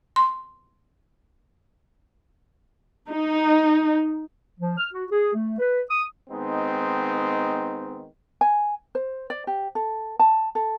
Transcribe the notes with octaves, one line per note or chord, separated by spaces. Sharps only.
C6
D#4
F3
F6
F#4
G#4
A3
B4
D#6
D#3 G#3 B3 C4 D#4
G#5
C5
D5
G4
A4
A5
A4